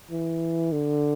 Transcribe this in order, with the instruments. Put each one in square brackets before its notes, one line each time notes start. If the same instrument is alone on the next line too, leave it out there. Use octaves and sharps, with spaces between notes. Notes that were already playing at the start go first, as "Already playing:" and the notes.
[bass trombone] E3
D3